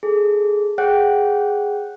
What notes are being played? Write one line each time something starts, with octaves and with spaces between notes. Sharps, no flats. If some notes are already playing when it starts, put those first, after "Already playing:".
G#4 A4
G#4 C#5 F#5 G5 F#6